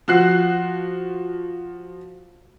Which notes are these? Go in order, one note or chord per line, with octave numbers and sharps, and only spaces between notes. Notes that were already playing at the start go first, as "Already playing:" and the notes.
F3 F#4 F#6 C7